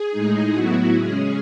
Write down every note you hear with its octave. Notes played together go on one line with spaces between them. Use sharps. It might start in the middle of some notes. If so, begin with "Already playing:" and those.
Already playing: G#4
A2 G#3 D#4
A2 F#3 B3 E4 F#4
C#3 G#3 C#4 G#4